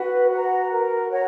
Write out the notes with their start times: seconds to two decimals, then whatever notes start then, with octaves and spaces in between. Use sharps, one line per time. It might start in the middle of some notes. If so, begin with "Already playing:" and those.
Already playing: F#4 B4
0.30 F#5
0.35 A#5
0.71 A#4
1.11 C#5 F#5 A#5